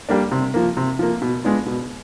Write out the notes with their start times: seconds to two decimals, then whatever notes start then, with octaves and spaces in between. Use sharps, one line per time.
0.09 G3 A#3 D4
0.31 C3
0.54 F3 A#3
0.77 C3
0.99 F3 A#3
1.22 B2
1.44 G#3 B3 D4 F4
1.66 B2